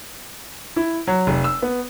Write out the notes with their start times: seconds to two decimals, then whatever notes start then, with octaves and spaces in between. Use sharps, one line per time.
0.76 E4
1.07 F#3
1.27 F1
1.44 E6
1.62 B3